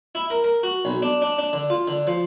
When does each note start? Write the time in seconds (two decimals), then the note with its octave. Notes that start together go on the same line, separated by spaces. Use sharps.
0.15 E4
0.30 A#4
0.44 A#4
0.63 F#4
0.85 B1
1.02 D4
1.22 D4
1.38 D4
1.53 D3
1.70 F4
1.88 D3
2.07 F3